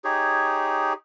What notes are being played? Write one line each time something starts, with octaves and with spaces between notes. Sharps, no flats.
D#4 G4 G#4 C#5